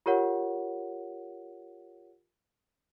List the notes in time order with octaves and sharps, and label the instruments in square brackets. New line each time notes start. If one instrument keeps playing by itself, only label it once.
[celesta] F4 G4 A#4 C#5 F#5